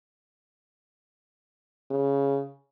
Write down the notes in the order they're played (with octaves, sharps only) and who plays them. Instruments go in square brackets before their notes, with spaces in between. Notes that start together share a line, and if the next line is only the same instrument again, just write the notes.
[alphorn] C#3